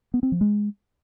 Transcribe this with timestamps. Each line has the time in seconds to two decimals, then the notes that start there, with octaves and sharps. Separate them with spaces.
0.14 B3
0.23 C4
0.32 F3
0.41 G#3